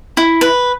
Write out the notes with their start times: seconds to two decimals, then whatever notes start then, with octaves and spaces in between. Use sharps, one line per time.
0.17 E4
0.41 B4